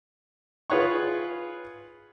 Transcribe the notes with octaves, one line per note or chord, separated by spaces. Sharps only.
F4 G#4 B4 C#5 F#5 C#6